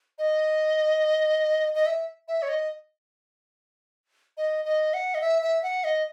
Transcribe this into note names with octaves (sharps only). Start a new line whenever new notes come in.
D#5
D#5
E5
E5
C#5
D#5
D#5
D#5
F#5
D#5
E5
E5
F#5
D#5